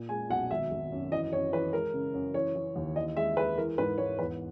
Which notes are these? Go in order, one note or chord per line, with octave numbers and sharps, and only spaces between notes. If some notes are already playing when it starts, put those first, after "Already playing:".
Already playing: A#2
G#3 G#5
B1 F#5
G#1 E5
G#1
F#2
E3 D#5
F#2 C#5
E3 B4
G#3 A#4
C#3
F#2
E3 C#5
E3
D#2
E3 D#5
G#3 E5
G#3 B4
E3 A#4
G#2 B4
G#2 C#5
E2 B4